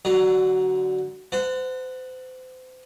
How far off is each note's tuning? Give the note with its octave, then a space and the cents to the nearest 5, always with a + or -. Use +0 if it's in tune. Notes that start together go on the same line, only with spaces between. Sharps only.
D3 +0 F#3 +15 A#5 +5
C5 -35 F#5 +0 A5 +40